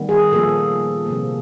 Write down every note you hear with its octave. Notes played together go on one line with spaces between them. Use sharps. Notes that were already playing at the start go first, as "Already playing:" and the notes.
Already playing: D#3 G3 B3
G#4
A#2 F3 A#3 A4
C3 F3 A#3